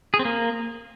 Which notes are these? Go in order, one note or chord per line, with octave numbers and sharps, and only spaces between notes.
G#4
C4
A#3